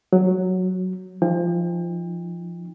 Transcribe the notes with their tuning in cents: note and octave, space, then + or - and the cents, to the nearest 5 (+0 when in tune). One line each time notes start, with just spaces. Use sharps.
F#3 +0 F#4 +0
F3 -15 D#4 +0 G5 +40